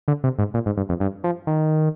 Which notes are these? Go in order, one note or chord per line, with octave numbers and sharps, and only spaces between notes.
D3
C3
G#2
A#2
G#2
G2
F2
G2
F3
D#3